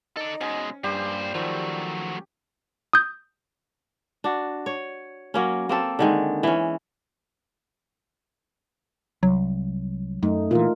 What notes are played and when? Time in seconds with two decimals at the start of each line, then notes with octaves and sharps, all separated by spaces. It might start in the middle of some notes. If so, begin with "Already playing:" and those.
0.17 D#4 A4 D5
0.41 B2 G#3 C#4
0.84 G2 A#2 G3 G4 C5
1.34 D#3 F3 F#3 A3 C5
2.93 D#6 G6
4.24 D4 F#4
4.66 C#5
5.34 F#3 A#3 C#4
5.69 A#3 C4 A4
5.99 D3 D#3 G#3
6.43 E3 C#4
9.23 C2 F#3
10.23 F#2 A3 D#4
10.51 A#2 E3 F4 A#4